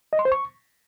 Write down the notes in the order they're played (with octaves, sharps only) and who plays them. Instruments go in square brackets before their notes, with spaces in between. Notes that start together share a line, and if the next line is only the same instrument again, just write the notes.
[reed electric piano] D#5
C6
C5
C#6